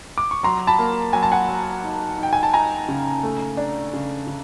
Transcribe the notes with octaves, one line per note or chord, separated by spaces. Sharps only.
D6
C#6
F#3 A#5 C6
A5 B5
A#3
F#3 G#5
A5
F#5 G#5
F#3
D#4
D#4 G5
G#5
A5
D#4 G#5 A#5
C#3
A3
D4
C#3
C#3